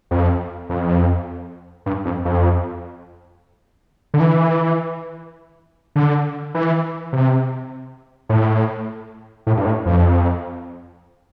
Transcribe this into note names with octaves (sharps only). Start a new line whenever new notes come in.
F2
F2
G2
F2
F2
D3
E3
D3
E3
C3
A2
A2
G2
A2
F2